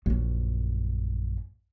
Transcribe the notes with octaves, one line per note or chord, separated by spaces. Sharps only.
A#1 F#2